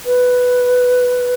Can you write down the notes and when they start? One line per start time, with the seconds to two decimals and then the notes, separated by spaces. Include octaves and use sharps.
0.06 B4